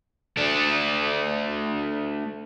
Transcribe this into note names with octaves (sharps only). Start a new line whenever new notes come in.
A3 D4